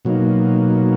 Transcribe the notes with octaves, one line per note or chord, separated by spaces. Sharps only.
B2 F#3 A#3 D#4